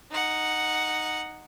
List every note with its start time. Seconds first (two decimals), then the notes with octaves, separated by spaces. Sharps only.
0.11 D#4 F#5